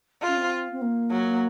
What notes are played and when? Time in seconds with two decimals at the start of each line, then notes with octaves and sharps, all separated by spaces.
0.22 C#4 F4
0.36 C4
0.72 C4
0.81 A#3
1.11 F#3